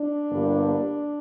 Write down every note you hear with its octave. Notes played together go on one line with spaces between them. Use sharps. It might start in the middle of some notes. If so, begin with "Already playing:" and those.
Already playing: D4
G1 G2 G3 A#3